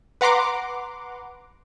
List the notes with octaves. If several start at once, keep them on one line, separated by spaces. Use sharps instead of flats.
B4 F#5 A#5 C6 D6